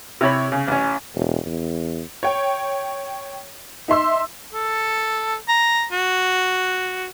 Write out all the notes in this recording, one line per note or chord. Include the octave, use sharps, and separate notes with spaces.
C3 E4 C#5 B5
C#3
A1 C#4
E1
E2
C#5 G5
D#4 E5 C6 E6
A4
A#5
F#4